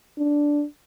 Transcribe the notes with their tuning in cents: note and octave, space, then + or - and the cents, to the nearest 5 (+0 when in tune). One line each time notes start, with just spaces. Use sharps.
D4 -5